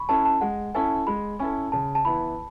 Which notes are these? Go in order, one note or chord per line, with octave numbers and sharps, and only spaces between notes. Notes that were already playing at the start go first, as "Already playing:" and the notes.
Already playing: B5 C#6
C#4 E4 A4 A5
A5
G#3 F#5
C#4 E4 A4 G#5
G#3 B5
C#4 E4 A4 G#5
C#3 A5
A5
E3 B3 E4 B5